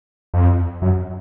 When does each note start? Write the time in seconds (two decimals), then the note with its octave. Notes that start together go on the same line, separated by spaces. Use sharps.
0.34 F2
0.82 F#2